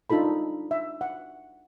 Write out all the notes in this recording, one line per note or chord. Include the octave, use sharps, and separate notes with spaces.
D4 D#4 F4 A4 B5
E5
F#5